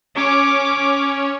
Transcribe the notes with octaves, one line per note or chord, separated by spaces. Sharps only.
C#4 C#5 D6